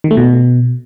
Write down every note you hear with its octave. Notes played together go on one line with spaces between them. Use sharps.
D#3
A3
B2